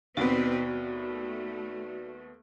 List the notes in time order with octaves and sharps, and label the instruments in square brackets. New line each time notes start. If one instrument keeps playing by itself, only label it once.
[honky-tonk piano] D#2 B3 [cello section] B2 C4 B4 [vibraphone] F#4 D5
[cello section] A3